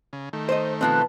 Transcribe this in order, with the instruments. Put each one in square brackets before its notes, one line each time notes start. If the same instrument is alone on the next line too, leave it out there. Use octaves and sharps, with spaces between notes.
[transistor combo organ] C#3
D#3 A3
[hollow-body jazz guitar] C5 D#5
[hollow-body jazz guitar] B2 F3 C4 [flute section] B4 A5 F#6